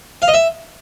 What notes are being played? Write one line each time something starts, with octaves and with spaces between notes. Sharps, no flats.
F5
D#5
E5